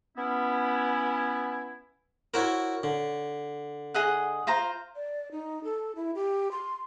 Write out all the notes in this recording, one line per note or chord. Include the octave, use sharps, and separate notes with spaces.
B3 C#4 E4
E4 F#4 A#4 C5 C#5
D3
G#4 D#5 F#5
F4 C5 A#5
D5
D#4
A4
E4
G4
C6